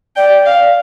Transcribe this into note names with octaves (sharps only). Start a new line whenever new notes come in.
D5 G5
F5